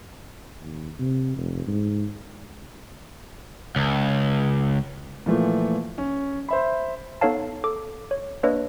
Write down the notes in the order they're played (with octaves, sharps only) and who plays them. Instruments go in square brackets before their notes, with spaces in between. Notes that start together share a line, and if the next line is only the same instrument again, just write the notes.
[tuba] D#2
C3
F1
G#2
[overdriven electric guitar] C#2
[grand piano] A#2 E3 F3 A3
C#4
C5 E5 B5
[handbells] B3 D#4 A4 C#5 F5 A5
A4 D6
C#5
A#3 D4 B4 C#5 D#5